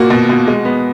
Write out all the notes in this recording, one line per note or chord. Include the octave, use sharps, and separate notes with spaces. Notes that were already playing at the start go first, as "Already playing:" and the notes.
Already playing: A#2 A#3 F#4
B2
B2
G#3
B3